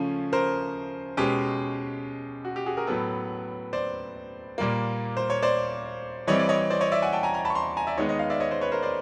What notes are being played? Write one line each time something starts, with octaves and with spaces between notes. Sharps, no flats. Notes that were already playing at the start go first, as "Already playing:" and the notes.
Already playing: C#3 F3 A3 C#4
A#4 C5
B2 G#3 C#4 G4
F#4
G4
F#4 G#4
G#4 A#4
A2 F#3 B3 A4 B4
C5 D5
A#2 G3 A#3
C5
C#5
C5 D5
E3 G3 C4 C#5 D#5
D5
C#5 D#5
C5 D5
C#5 D#5
D5 E5
F#5 G#5
G5 A5
G#5 A#5
G#5 A#5
A5 B5
C#6
A#5 C6
G#5 A#5
D5 E5
D#3 G#3 B3 C#5 D#5
C#5 D#5
D#5 F5
D5 E5
C#5 D#5
C5 D5
B4 C#5
A#4 C5
C5 D5